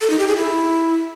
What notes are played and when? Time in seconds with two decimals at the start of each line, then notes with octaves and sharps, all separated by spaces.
0.01 A4
0.10 D#4
0.19 G4
0.28 G#4
0.37 E4